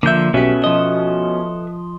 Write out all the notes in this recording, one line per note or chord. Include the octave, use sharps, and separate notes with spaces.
D3 F3 A#3 E5 G6
B1 B2 C#4 G4 A4 B4 E5
F3 D#5